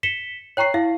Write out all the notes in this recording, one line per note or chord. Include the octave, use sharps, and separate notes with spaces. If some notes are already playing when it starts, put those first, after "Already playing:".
B6 C#7 E7 G7
C#5 G5 A#5 C#6 C7
E4 F5